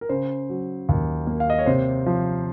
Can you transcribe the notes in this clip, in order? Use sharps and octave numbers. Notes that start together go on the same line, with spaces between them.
A#4
C#3 C5
F#3
D#2
A#3
F5
D#5
C#5
C3 C5
F3